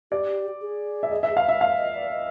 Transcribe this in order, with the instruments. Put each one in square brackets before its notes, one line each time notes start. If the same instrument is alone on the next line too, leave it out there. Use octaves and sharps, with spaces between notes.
[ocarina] G4 [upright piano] D5
[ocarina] G#4
[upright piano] E5
D#5
E5
F5
E5
F5
[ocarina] D#5
D5
D#5